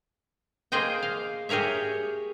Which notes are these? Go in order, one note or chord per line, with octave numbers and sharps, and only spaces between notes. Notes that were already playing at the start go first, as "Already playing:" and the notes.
A#3 G#4 C5 D#5 G5
F5
G4 G#4 A#4 C#5 E5